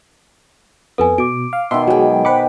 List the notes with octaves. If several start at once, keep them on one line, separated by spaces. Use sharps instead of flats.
F2 B3 A4 B4 G#5
B2 D6 D7
F5
B2 D#3 E5 C6
F#3 G#3 G5 G#5
B4 C5 G5 B5 D6